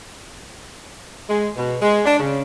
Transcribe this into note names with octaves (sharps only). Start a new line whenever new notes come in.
G#3
B2
G#3
D4
C#3